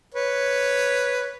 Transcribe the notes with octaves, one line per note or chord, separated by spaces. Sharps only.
B4 C#5